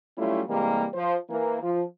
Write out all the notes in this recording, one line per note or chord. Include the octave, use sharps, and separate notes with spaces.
F#3 G3 A3 C#4 E4 F4
C3 E3 G3 G#3 A#3
F3 C5
E3 A#3
F3